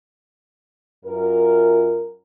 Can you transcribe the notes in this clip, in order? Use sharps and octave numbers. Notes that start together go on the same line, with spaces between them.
F#2 F4 A#4